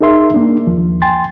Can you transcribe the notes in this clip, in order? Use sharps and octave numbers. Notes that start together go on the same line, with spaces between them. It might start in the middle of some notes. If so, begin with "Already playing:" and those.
D#4 G#4 A#4 E5 C6
A#3 D4
D#2 F3
G5 G#5 C6 A6